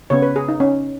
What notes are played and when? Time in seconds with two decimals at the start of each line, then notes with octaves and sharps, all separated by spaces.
0.10 C#3 B3 C#5
0.22 B4
0.36 G#4
0.48 D#4
0.60 C#4